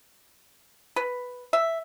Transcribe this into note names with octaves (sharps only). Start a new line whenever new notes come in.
B4
E5